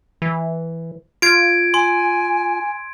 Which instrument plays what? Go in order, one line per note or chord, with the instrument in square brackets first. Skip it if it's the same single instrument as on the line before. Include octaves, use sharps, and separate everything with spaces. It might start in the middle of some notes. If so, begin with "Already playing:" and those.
[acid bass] E3
[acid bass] F4 [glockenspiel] G#6 D7
[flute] G#5 [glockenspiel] C6